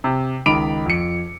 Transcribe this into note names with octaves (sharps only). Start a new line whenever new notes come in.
C3
C#2 D#3 B5 D6 D7 F7
F2 C#7